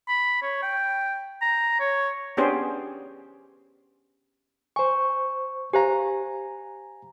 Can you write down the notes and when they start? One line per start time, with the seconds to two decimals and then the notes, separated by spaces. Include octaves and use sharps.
0.08 B5
0.42 C#5
0.62 G5
1.41 A#5
1.80 C#5
2.37 B3 C#4 D4 G4 G#4 C5
4.76 C5 G#5 C#6
5.73 G4 C5 F5 G#5 A#5